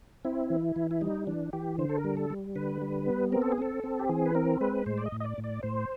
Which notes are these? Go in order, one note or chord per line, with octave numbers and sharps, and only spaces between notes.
C4 E4
E3
E3
E4
G3 D#4
E3 D4
E3 G4
D3 C5
A4
A#4
G3
A4
G3
D3 B4
G3
B3
C4 A#4
A4
G#4
C4 A4
C4
G4
E3 G#4
B4
C4 A#4
G#3 B4
A2 C5
D5
D#5
A2
D#5
D5
A2
D5
A2 C5